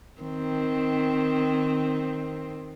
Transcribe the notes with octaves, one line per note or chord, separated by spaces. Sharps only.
D#3 C4